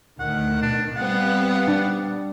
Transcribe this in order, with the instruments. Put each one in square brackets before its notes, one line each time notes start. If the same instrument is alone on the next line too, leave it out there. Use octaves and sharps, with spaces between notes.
[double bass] D2 [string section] A2 D#3 [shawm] F#5
[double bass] B2 [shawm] D4
[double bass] G3 [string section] B3 C4 F5 [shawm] F#5 [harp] A6
[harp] D4